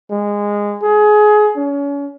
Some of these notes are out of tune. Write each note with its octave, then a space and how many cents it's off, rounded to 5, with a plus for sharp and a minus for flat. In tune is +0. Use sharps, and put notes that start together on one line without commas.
G#3 -15
G#4 +25
C#4 +35